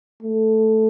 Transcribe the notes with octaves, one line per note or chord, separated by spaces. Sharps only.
A3